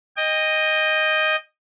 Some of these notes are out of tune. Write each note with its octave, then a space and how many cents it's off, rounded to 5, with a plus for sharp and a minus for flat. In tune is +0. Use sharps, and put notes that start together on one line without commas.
D#5 +0 G5 +30